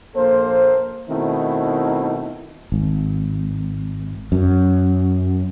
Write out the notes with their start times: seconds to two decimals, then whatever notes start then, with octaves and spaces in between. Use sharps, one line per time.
0.15 A#1 A#3 A4 C5
1.09 B2 D#3 A3 C4 D#4 E4
2.72 G#1
4.32 F#2